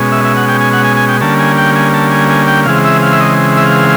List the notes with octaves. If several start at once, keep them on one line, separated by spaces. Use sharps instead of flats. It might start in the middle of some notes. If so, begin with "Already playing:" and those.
Already playing: B2 G#3 C#4
E5
E5
F#5
G5
G#5
F#5
G#5
G#5
G5
D3 G3 A#3 C#4 A5
G#5
G5
G#5
A5
G#5
G#5
G5
C#3 E3 G#3 C4 F5
E5
F5
E5
D#5
E5
F5